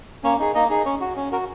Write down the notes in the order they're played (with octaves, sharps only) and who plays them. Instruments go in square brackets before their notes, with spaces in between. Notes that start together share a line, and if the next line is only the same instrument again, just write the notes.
[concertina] A#3 C#4 C#5
D#4 G#4
A#3 D#4 D#5
D#4 G#4
C#4 C#5
F#4
C#4
F#4 A#4